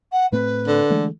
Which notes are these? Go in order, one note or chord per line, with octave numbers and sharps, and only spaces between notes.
F#5
A2 A3 C4 B4
D3
E3 G#3 A3